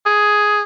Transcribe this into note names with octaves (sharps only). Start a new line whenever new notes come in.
G#4